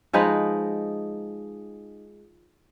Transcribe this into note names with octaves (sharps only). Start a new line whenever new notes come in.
F3 G#3 D#4 B4